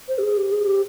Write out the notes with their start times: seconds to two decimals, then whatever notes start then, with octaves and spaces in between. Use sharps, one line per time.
0.09 C5
0.18 G4
0.23 G#4
0.37 G4
0.52 G#4
0.67 G4